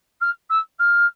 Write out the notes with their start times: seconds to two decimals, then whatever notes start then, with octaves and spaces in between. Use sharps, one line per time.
0.21 F6
0.49 E6
0.79 F6